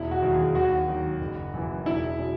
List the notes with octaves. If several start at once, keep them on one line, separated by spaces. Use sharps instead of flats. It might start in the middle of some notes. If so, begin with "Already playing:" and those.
Already playing: E1 E4
F#4
D#2 D#3 F#3
G#4
D#2 F#4
D#3 F#3
F#1
F#2 E3
E1 E4
C#3 F#3